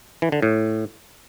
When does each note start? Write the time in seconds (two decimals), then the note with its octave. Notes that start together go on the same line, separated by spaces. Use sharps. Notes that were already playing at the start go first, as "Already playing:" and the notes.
0.22 E3
0.32 D3
0.43 A2